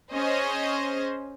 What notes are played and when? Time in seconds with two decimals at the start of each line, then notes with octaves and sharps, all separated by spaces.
0.13 C#4 G#4 C5 D#5